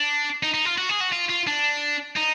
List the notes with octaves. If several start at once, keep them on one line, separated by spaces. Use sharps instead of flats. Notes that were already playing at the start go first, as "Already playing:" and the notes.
Already playing: D4
D#4
D#4
F4
F#4
G#4
F#4
F4
F4
D4
D#4